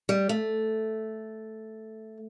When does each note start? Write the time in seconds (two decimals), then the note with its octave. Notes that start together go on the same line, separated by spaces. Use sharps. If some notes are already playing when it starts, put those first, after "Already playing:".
0.09 G3
0.29 A3